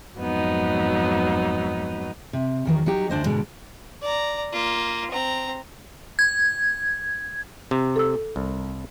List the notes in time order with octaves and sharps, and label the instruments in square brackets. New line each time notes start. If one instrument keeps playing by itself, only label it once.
[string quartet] F2 G#2 F#3 B3 D#4
[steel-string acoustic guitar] C3
E2 D#3 F#3
F#3 D#4 G4
D2 D4 C5 D#5
G#2 B2 D3 G#3
[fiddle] D5 A#5
A#3 F4
C4 A#5
[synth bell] G#6
[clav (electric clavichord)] C3
[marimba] A4 E6
[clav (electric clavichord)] C2